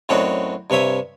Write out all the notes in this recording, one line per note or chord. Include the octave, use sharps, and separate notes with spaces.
F#2 A2 C4 D4 D#4 F#4
G2 C3 C#5 E5 D#6